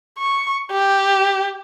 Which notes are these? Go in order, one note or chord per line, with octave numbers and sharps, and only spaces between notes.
C#6
G4